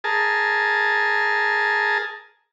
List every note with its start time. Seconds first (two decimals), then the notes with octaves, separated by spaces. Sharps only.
0.04 G#4 A#4 A5